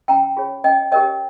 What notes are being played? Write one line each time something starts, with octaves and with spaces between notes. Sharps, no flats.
C#4 G5 A#5
F4 G#4 C#5
C#4 D#5 G5
G4 A#4 C#5 D#5 G5